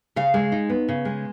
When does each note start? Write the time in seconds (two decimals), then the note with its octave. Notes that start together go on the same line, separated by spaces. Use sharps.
0.16 C#3 F5
0.34 G#3
0.52 D#4
0.69 B3
0.89 C#3
1.05 G#3